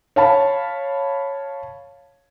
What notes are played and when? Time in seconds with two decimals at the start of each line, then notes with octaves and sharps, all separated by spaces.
0.16 C#5 F5 A5 B5